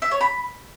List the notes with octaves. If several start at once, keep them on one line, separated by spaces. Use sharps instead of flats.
E5
C#5
B5